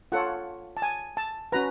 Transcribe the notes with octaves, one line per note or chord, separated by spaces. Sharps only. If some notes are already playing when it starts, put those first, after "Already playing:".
F4 A4 C#5 F#5
A5
G#5
A5
C#4 F#4 B4 A#5